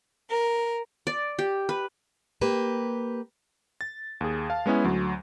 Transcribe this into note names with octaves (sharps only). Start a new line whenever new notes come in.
A#4
D5
G4
B4
A#3 G4 B4
A6
D#2 G#4
F5 A5
G#3 B3 C#4 E4 G#5
D2 F#3